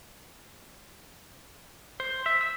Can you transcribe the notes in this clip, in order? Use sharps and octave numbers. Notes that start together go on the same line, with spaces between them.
C5
E5
E6